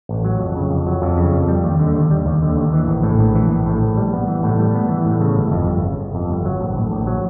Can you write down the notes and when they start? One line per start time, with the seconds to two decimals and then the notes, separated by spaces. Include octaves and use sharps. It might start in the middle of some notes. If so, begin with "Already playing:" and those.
0.09 A1
0.25 F#3
0.40 F2
0.56 C#3
0.71 F2
0.87 F#3
1.02 F2
1.17 C#3
1.33 F2
1.48 G3
1.64 D#2
1.79 D3
1.95 D#2
2.11 G3
2.26 D#2
2.42 D3
2.57 D#2
2.73 E3
2.88 A#1
3.03 A2
3.19 A#1
3.35 E3
3.50 A#1
3.66 A2
3.82 A#1
3.97 G3
4.13 B3
4.28 E3
4.43 A2
4.59 G3
4.75 B3
4.90 E3
5.06 A2
5.21 C#3
5.37 G1
5.52 F2
5.68 G1
5.84 C#3
5.99 G1
6.15 F2
6.30 G1
6.45 F#3
6.61 A#1
6.76 A2
6.91 A#1
7.07 F#3